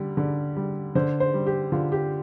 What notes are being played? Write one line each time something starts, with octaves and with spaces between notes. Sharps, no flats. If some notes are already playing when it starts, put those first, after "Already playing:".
Already playing: D3 G3
D3
G3
D3 C5
C5
G3
G4
D3 F4
G4